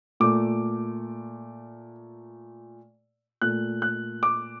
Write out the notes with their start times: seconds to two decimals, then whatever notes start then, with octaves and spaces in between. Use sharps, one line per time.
0.20 A#2 A3 D6
3.42 A#2 A3 F#6
3.82 F#6
4.23 D6